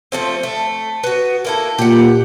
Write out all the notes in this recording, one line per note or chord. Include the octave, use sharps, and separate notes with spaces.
F3 A3 C4
A3
B3 F#4
A#3 E4 A4
A#2 G4 F#5